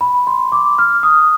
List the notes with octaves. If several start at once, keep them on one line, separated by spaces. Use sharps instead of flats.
B5
C6
D6
F6
D#6